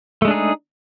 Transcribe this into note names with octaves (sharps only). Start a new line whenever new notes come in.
G#3 A3 D4 D#4 G#4